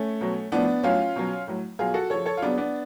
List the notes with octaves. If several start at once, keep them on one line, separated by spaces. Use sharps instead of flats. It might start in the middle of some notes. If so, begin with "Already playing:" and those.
Already playing: A3 C#4
B2 F#3
A2 F3 B3 D4
A2 F#3 C#4 F4
B2 F#3
A2 F#3
B2 F#3 F4 G#4
F#4 A4
C#3 F3 A4 C#5
A4 C#5
F4
C#3 F#3 B3 D4
B3 D4